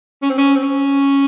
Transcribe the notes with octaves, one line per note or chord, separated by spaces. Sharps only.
C#4
C4
C#4
C4
C#4